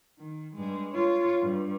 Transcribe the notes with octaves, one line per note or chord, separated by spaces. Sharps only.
D#3
G2 G#3
F4 C#5
G2